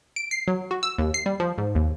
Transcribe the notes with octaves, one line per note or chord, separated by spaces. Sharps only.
D7
C7
F#3
F#4
E6
D#2
C7
G3
F3
G#2
D#2